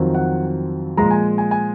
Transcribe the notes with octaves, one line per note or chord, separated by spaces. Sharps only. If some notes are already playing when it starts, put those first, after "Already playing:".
Already playing: F2 D#3 F#3 C4
F#5
A#2 F3 G#3 A#5
G#5
G#5
G#5